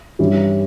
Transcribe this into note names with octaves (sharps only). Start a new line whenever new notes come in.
G2 E3 G3 C#4 E4